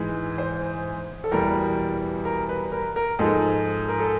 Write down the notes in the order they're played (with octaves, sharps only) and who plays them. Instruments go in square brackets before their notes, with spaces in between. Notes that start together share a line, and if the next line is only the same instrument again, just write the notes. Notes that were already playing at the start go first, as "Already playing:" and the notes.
Already playing: [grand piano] G#2 E3 G#3
C5
A4
E2 B2 G3 A#4
A#4
B4
A#4
A#4
G#2 F3 G#3 A4
A#4
A4